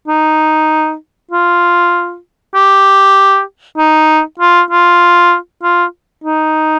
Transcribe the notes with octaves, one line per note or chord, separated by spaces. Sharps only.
D#4
F4
G4
D#4
F4
F4
F4
D#4